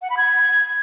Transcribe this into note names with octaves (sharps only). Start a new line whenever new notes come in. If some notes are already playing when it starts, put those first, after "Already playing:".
F#5
B5
G#6